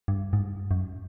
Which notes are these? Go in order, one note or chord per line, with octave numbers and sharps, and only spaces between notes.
G2
G#2
G2
F#2